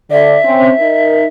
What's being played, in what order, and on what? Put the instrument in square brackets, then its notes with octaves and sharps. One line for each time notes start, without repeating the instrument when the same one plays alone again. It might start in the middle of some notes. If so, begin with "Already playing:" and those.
[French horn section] D3 D5 [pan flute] E5
[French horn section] C4 C#4
D#4 A#4